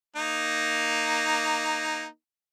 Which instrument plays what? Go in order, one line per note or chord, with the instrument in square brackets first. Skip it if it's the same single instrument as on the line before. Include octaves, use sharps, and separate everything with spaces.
[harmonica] A#3 D#4